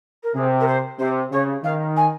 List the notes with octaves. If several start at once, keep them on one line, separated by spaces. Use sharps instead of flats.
A#4
C3 G#4
A#4
C5
C3 C5
C#3 C#5
D#3 F5
G#5